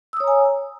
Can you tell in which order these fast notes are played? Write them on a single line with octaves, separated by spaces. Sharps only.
E6 D#6 C#5 A#5 G#5